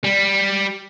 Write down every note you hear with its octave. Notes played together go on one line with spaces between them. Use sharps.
G3